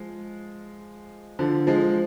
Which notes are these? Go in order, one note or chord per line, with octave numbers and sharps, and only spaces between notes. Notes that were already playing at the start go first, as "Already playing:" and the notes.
Already playing: F3 G#3
D3 F3
F3 G#3